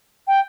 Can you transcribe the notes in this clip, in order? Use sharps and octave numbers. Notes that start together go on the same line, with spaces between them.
G5